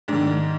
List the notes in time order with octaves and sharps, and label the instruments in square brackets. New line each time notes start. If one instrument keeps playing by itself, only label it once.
[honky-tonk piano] G#2 D#3 D4